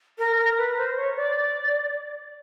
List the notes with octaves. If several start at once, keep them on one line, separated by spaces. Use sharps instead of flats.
A#4
A#4
B4
C5
C#5
D5